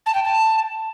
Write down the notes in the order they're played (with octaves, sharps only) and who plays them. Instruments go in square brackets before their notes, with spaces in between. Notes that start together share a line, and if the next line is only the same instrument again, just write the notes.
[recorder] A5
G5
A5